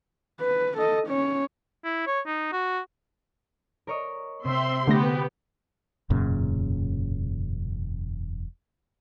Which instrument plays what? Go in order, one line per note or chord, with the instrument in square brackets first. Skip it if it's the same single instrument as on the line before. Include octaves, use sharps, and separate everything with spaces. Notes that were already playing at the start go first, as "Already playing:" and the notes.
[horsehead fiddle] B4
A4 D#5
C#4 C#5
[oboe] E4
C#5
D#4
F#4
[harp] A#4 C#5 D#5
[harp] C3 [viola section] C4 E5 C6
[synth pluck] D3 A3 A#6 [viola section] B3 G4
[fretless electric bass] E1 F#2 A#2 C#3